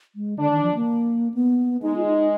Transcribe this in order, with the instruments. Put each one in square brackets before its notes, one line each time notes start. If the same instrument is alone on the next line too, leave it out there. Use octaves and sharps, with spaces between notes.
[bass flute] G#3
[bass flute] D3 [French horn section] D4
[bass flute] D#3
F3
A#3
B3
[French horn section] G#3 [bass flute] D#4
[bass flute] F4
D#4